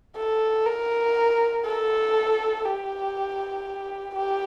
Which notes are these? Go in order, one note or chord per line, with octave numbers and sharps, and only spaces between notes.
A4
A#4
A4
G4
G4